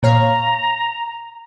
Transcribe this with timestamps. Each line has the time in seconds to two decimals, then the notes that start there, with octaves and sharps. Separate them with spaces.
0.03 A#2 C#5 F5 A#5